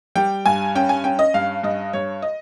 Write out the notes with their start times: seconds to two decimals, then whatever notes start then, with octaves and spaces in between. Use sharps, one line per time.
0.16 G3 G5
0.46 G2 G#5
0.75 C#4 G5
0.89 G#5
1.04 C#4 G5
1.19 D#5
1.34 G2 F5
1.63 G2 D#5
1.93 G2 C#5
2.22 D#5